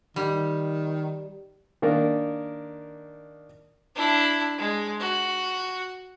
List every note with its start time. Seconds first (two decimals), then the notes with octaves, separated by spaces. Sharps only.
0.16 D#3 G3
1.82 D#3 A#3 D4 A#4
3.95 D4 E4
4.58 G#3
5.00 F#4